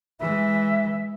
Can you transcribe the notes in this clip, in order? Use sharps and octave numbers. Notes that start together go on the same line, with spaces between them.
E3 G#3 E5